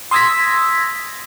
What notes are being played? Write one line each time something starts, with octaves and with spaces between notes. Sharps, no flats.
C6 D#6 E6 G#6 A#6 B6